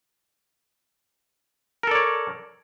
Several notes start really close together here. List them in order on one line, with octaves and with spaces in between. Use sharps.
A#4 A4 D5 C#5